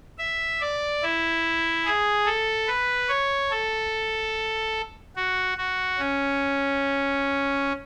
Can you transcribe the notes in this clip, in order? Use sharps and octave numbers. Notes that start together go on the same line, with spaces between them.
E5
D5
E4
G#4
A4
B4
C#5
A4
F#4
F#4
C#4